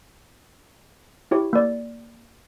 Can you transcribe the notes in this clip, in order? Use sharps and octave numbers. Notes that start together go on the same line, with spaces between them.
E4 G4 C#5
A#3 D5